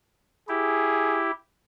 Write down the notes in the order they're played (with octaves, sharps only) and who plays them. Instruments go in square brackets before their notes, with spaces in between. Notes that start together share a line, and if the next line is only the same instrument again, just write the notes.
[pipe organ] E4 G4 [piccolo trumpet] G#4